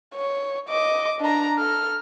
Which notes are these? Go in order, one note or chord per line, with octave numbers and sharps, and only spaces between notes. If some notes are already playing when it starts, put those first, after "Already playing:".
C#5
D#5 D6
D4 A#5
A4 F6